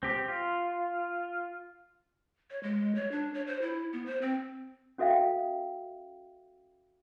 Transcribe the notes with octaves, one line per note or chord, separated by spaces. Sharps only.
C4 G4
F4
C#5
G#3
C#5
D4
C#5
C5
E4
B3
C5
C4
C#4 F#4 A4 E5 F5 G5